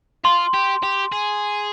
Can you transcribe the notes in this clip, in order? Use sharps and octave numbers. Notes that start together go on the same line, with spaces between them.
F4 C6
G4
G4
G#4